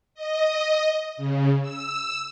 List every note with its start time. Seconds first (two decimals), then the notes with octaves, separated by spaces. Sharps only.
0.14 D#5
1.17 C#3
1.61 E6